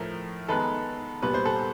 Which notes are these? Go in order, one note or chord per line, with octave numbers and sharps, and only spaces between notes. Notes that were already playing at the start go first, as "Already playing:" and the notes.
Already playing: A2 F3 A3 A#4
D#3 G#3 B3 A4 B4
A#2 G3 B3 B4
C5
A4 B4